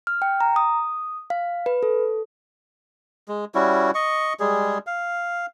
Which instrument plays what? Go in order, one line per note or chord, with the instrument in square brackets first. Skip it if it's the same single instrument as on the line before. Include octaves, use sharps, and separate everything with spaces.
[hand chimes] F6
G5
A#5
D#6
F5
B4
A4
[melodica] G#3
G3 C#4 E4 F#4
D#5 C#6
G3 G#3 G#4
F5